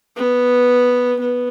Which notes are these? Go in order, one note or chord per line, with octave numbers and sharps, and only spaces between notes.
B3
B3